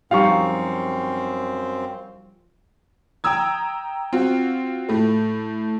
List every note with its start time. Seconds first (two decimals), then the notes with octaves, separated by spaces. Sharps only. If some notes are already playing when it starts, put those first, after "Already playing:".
0.11 F#2 F3 G3 C4 D#4 F5 C#6
3.24 G5 A#5 D#6 E6 G#6
4.13 C4 F4 F#4
4.89 A2 A3